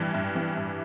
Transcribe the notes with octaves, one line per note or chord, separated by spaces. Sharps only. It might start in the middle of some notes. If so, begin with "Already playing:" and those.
Already playing: G2 E3
G2
E3
G2